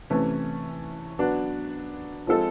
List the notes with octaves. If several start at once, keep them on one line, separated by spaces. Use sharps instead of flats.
C3 E3 A3 C#4
F#3 B3 D4
F3 G#3 C4 F4 A4